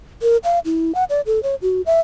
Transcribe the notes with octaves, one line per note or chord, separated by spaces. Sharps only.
A#4
F5
E4
F#5
D5
A4
C#5
F#4
E5